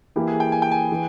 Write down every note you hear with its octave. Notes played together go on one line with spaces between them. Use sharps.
E3 A#3 E4 G4
G#4
G5
G#5
G5
G#5
E3